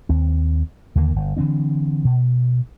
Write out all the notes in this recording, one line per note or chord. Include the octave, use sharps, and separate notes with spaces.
D#2 C4
D#2 D3 F3 A#3
G1
D3 E3 C4 D4
B2